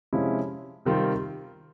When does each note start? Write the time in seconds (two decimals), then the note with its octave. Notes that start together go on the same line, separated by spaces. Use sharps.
0.13 C3 F3 G#3 C#4 E4
0.85 C3 D#3 G3 C4 F4